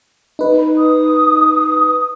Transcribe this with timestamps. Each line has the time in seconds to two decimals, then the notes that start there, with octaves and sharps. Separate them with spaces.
0.39 D#4 B4
0.78 D#6